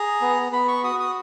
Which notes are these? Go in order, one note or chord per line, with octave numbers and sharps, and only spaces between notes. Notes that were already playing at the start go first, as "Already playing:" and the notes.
Already playing: G#4 A#5
B3
B3 B5
C#6
F#4 D#6
D#6